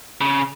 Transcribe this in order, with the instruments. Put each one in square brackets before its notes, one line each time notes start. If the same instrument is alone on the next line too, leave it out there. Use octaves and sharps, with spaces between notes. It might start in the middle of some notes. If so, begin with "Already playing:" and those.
[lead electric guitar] C#3